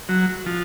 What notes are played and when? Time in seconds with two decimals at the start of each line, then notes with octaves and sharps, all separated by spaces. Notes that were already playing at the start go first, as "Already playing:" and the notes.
0.09 F#3
0.46 F3